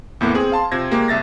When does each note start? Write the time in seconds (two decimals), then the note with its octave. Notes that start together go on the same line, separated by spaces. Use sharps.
0.21 E2 A2 A#3 B3
0.34 C4 G#4
0.52 F5 A5 C6
0.72 C3 F4 C5 G#6 A#6
0.91 G#3 A#3 G4
1.08 C2 E5 A6 A#6